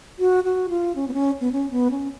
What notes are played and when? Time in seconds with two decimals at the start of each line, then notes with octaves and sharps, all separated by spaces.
0.19 F#4
0.44 F#4
0.69 F4
0.96 C#4
1.08 B3
1.14 C#4
1.41 B3
1.52 C#4
1.71 B3
1.91 C#4